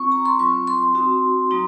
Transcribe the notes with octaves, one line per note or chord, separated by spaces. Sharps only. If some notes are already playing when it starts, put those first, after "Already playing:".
Already playing: C4 F4 C#6
A#5
C6
F#3 C4 F4 C#6
C6
C4 D#4 F#4
F#3 A#3 D#4 F#4